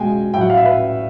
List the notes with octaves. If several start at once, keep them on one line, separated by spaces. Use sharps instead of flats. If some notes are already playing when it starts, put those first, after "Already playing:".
Already playing: B2 G#3 G5 G#5
A2 F#3 F#5 G5
F5
E5
B4